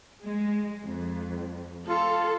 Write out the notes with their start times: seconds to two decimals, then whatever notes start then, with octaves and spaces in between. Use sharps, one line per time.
0.24 G#3
0.82 F2
1.89 F4 A4